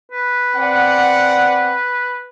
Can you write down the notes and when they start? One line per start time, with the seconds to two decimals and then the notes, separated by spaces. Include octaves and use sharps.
0.11 B4
0.55 C4 D5 F#5